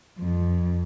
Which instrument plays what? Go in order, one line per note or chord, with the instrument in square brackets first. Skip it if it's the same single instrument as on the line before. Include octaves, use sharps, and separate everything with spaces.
[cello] F2